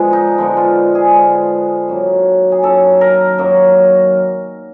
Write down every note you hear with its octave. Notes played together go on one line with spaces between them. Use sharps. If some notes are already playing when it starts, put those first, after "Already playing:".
Already playing: D3 F3 G#3 B3
D#4
D3 F3 G#3 B3
F4
G#4
D3 F3 G#3 B3
F#2 D#3 F#3 A#3
G#4
F#2 D#3 F#3 A#3 A4
A#4
F#2 D#3 F#3 A#3